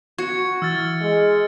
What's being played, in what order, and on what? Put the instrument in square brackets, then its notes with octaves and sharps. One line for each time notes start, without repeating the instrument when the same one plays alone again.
[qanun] F#4 [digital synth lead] C#6 [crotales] G#6 C#7
[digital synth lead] E3 [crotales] E6 F6 A6
[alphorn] G#3